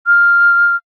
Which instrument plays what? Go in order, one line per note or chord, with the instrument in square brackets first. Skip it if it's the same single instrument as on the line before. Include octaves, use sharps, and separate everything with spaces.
[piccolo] F6